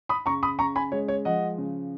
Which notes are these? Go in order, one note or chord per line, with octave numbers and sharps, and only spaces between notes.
B5 D#6
C#3 A#5 C#6
B5 D#6
C#3 A#5 C#6
G#5 B5
G#3 C#5
C#5
F3 D#5 F#5
C#3